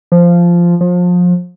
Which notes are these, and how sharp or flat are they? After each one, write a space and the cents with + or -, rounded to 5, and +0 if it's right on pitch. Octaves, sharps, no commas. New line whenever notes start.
F3 -10
F3 +30